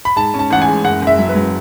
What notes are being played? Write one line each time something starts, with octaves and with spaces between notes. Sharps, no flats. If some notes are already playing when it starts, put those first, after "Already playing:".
B5
G#2 A5
C#4
A5
A1 F#5
G#5
G#3
F#1 F#5
F#1
E5
F#3
B4
F#3